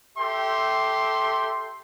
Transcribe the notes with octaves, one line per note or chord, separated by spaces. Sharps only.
G4 A4 E5 G5 C6